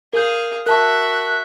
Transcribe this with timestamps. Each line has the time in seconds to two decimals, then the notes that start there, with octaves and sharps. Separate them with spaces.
0.13 G#4 A#4 F5 G6
0.66 F#4 A#4 E5 A5 C#6 F#6